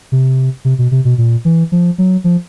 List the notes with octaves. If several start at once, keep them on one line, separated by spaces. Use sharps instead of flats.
C3
C3
B2
C3
B2
A#2
E3
F3
F#3
F3